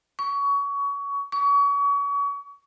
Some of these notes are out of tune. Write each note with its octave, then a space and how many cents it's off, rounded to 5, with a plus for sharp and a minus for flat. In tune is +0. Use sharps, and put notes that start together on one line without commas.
C#6 +25
C#6 +35